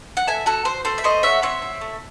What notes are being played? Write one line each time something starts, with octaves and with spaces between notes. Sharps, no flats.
F#5
A4 E5 G#5
F#4 A4
F#4 C5
A3 C5
E5
A3 C5 D#5
F#4 C#5 E5
C4 C#5 E5
C4
A3